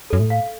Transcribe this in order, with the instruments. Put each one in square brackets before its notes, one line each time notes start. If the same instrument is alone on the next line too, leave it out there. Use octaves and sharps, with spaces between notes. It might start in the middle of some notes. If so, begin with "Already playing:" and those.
[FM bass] F#2 [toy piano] A4
[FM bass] A2
[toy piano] F5